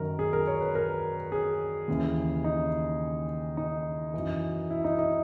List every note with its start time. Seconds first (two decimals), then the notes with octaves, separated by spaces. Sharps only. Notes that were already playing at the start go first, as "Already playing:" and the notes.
Already playing: F#2 D#3 F#3 A#4
0.19 G#4
0.33 A#4
0.47 C#5
0.61 B4
0.75 A#4
1.32 G#4
1.88 D#2 C#3 E3
2.44 D#4
3.57 D#4
4.14 F#2 E3
4.70 E4
4.84 D#4
4.99 D#4